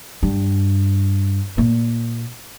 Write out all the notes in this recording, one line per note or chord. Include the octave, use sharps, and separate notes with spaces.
G2
A#2